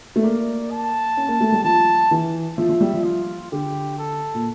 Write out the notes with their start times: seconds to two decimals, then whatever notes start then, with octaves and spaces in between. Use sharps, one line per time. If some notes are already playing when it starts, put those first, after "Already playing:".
0.16 A3
0.23 A#3 D5
0.71 A5
1.17 C#4
1.28 A#3
1.41 A3
1.52 G3
1.64 F3 A5
2.11 E3
2.58 F3 E5
2.69 F3
2.81 G3
2.94 F3
3.05 F4
3.52 D3 G4
3.98 A4
4.34 A#2